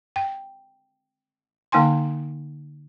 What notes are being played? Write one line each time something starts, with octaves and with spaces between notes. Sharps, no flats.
G5
D3 A#3 D#4 G5 G#5 C6